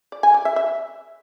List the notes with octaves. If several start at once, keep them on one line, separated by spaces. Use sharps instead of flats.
D5
G#5
D5
E5
E5